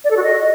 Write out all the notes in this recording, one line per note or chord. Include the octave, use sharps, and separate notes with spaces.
D5
A4
F#4
D#5